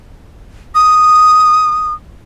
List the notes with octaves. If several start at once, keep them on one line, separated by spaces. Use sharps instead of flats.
D#6